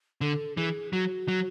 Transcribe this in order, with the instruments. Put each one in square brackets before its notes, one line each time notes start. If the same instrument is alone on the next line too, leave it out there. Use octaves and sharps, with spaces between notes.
[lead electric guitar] D3 [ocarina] A4
[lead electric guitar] E3 [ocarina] G#4
[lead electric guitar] F#3 [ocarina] F#4
[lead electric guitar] F#3